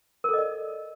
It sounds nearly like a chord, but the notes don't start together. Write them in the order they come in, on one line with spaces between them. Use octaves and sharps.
A#4 A4 D#5 D5